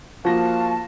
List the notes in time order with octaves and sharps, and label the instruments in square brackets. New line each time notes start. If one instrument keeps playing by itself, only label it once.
[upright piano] F3 A#6 [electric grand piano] A#3 F4 F#4 [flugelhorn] F5 [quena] A5